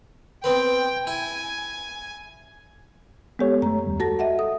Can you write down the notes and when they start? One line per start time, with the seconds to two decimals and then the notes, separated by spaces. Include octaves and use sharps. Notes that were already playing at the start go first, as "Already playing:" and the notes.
0.44 B3 C4 B4 G5
1.07 E4 G#5
3.39 G#3 B3 G4 A4 C#5
3.62 F#2 A3 A#5
3.86 D#2 G3
4.00 F#4 A4 A5 A#6
4.19 D#5 E5 F#5
4.39 A4 D#6